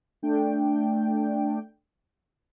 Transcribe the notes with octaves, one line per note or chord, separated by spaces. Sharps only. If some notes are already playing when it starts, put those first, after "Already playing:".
A3 D4 G5